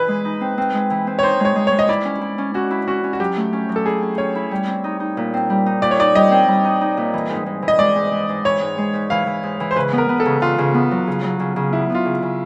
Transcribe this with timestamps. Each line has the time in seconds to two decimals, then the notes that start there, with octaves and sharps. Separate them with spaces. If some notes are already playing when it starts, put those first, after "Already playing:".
Already playing: E3 B4
0.08 G#3
0.25 D#4
0.41 C4
0.58 C4
0.74 G#3
0.91 E3
1.07 C4
1.19 C#5
1.23 D#4 C5
1.40 G#3 C#5
1.56 G#3
1.67 G#3 C#5
1.79 D#5
1.89 E4 D5
2.05 C#4
2.21 E4
2.38 C#4
2.54 C#4 F#4
2.71 E4
2.87 C#4 F#4
3.04 C#4
3.13 F#4
3.20 F#3 G4
3.37 A3
3.53 C#4
3.69 F#3
3.76 A4
3.86 E4 G#4
4.02 C#4
4.18 C#4 C#5
4.35 E4
4.51 G3
4.67 C4
4.84 D#4
5.00 D#4
5.17 A#2
5.34 C4
5.50 G3
5.66 D#4
5.82 A#2 D5
5.91 C#5
5.99 D#4 D5
6.15 G3 D#5
6.31 C4
6.48 G3
6.64 D#4
6.81 D#4
6.97 A#2
7.14 E3
7.30 G#2
7.46 G#2
7.62 E3
7.68 D#5
7.79 G#3 D5
7.96 G#2
8.12 G#2
8.29 G#2
8.45 E3 C#5
8.61 G#2
8.78 G#3
8.94 G#2
9.10 E3 F5
9.27 E3
9.43 G#2
9.60 E3
9.71 C5
9.76 C#3 B4
9.93 B3
9.98 A#4
10.09 B3
10.20 A4
10.25 C#3
10.41 C#3 F4
10.58 C#3
10.74 B3
10.91 F#3
11.07 C#3
11.24 F#3
11.40 C#3
11.56 C#3
11.73 B3 E4
11.90 B3
11.95 F4
12.05 C#3
12.22 C#3